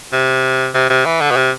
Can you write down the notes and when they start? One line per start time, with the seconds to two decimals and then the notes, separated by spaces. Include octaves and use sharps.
0.13 C3
0.74 C3
0.90 C3
1.05 E3
1.21 D3
1.31 B2
1.37 C3